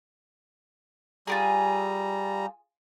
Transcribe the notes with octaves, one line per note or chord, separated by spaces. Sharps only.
G3 F4 G4 G#4 A#5